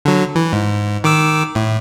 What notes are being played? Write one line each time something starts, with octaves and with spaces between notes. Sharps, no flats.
D3 F#3
E3
G#2
D#3 D6 E6
A2